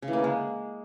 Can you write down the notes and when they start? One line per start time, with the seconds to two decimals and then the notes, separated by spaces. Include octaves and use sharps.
0.02 C#3
0.08 E3
0.13 A#3
0.19 D3
0.24 G#3